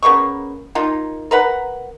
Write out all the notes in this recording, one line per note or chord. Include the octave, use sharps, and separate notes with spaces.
C#3 A#3 B3 C#6
A#3 D#4 F4
A#4 B4 F#5